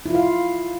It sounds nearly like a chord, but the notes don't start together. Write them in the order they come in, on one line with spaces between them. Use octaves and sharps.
E4 F4 F5